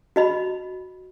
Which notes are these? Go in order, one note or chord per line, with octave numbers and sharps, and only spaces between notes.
F#4 D#5 B5